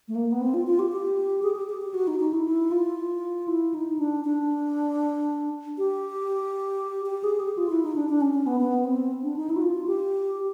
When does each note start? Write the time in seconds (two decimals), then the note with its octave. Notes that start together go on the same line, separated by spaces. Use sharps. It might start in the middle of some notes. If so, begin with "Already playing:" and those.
0.08 A3
0.15 A#3
0.32 B3
0.41 C4
0.54 F4
0.67 F4
0.79 G4
0.92 G4
1.43 G#4
1.55 G4
1.69 G4
1.81 G4
1.94 F#4
2.08 D#4
2.20 D#4
2.33 E4
2.45 E4
2.71 F4
3.48 E4
3.74 D#4
3.99 D4
4.25 D4
5.78 G4
7.06 G4
7.24 G#4
7.40 G4
7.58 F4
7.70 E4
7.83 D#4
7.96 D4
8.09 D4
8.21 C#4
8.33 C#4
8.47 B3
8.60 B3
8.85 C4
9.23 D4
9.37 D#4
9.49 E4
9.56 F#4
9.62 F4
9.87 G4